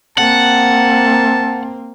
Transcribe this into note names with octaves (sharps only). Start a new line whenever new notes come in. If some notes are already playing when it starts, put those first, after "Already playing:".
A#3 C4 F#5 A5